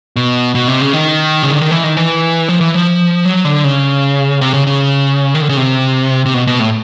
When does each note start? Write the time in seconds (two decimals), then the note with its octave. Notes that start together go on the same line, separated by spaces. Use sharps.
0.16 B2
0.55 B2
0.68 C3
0.81 C#3
0.93 D#3
1.43 C#3
1.52 D3
1.61 D#3
1.71 E3
1.84 D#3
1.97 E3
2.49 F3
2.61 E3
2.74 F3
3.25 F#3
3.45 D3
3.64 C#3
4.41 C3
4.54 C#3
4.67 C#3
5.35 D#3
5.42 D3
5.49 C#3
5.57 C3
6.26 C3
6.34 B2
6.47 B2
6.60 A2